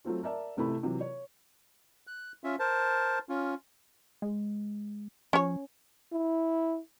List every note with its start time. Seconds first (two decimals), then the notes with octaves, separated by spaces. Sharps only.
0.05 F#3 A3 C4 F4
0.23 A#4 D5 E5 A5
0.57 A1 C3 A3 E4 B5
0.83 C3 E3 F#3
1.01 C#5
2.07 F#6
2.44 C#4 F4 E5
2.59 A#4 C5 A5
3.29 C#4 F4
4.22 G#3
5.33 F3 C#4 C#5
6.13 E4